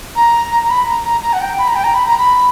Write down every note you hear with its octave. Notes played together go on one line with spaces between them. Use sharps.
A#5
A#5
A#5
B5
A#5
A#5
A#5
F#5
G5
B5
A#5
G5
A#5
B5
A#5
B5